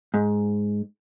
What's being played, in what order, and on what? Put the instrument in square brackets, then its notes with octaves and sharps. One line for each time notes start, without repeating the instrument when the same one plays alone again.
[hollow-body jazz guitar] G#2